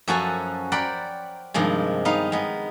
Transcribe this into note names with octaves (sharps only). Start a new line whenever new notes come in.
F#2 F3 C#4 F#4 A4 G#5
A#4 C5 D5 F#5 G5 B5
G2 C3 D#3 F3 G#3
B3 D#4 F5
G#3 B3